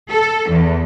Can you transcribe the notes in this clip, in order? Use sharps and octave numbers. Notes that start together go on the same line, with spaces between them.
A4
E2